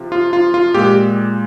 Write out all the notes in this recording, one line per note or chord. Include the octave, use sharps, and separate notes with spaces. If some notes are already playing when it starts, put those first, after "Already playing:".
Already playing: C3 F3
F4
F4
F4
A#2 G#3 G4